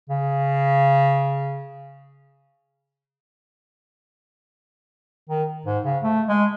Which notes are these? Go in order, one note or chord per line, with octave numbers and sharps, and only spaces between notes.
C#3
D#3
G#2
C#3
A3
G#3